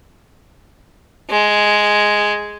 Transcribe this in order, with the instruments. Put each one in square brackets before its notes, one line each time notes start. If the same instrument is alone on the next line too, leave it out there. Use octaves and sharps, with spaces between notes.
[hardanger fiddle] G#3